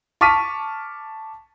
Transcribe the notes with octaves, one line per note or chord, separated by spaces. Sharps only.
A5 C#6 D6 F6 B6 D#7